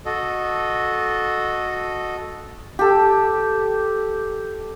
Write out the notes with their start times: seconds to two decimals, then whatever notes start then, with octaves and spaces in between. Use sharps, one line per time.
0.05 F#4 A4 D#5
2.79 G4 A4